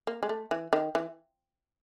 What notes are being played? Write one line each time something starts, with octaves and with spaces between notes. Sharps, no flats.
A#3
G#3
A3
E3
D#3
E3